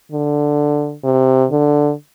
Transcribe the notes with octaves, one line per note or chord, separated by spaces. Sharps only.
D3
C3
D3